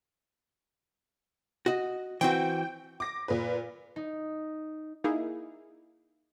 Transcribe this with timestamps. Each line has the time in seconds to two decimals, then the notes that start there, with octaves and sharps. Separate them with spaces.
1.66 F#4 D#5
2.21 E3 C4 F#4 G5
3.00 D6 A#6
3.28 A#2 B4
3.96 D#4
5.04 A#3 D#4 E4 G#4